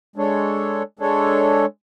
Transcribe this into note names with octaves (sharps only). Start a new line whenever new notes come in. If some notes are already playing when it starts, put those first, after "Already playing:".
G#3 D4 A4 C#5
G#3 D4 A4 C#5